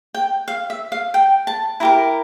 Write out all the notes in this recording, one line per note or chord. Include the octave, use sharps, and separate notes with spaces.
G5
F5
E5
F5
G5
A5
E4 G4 A#4 A#5